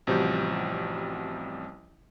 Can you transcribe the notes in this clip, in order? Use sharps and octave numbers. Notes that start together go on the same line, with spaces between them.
A1 C3 F3 G3 F#4 G6